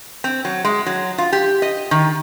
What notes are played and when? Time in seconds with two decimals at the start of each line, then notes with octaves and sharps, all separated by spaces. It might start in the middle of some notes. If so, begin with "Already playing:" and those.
0.24 C4
0.45 F#3
0.64 G#3
0.86 F#3
1.18 F4
1.33 G4
1.62 D#5
1.91 D#3